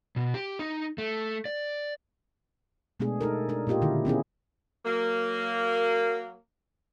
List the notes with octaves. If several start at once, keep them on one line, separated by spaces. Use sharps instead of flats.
B2
G4
D#4
A3
D5
B2 G#3 A3 B3 D4 G#4
D#4 A4 A#4
D4 A#4
A#2 A#3 F4 G4 D#5
D3 D#3 E4
B3 C#4 E4 G#4
F#3 A#3